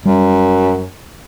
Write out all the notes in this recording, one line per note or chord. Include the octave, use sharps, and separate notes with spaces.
F#2 G3